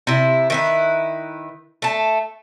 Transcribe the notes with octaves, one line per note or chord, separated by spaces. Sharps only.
C3 E4
D#3 E4 B4
A3 A5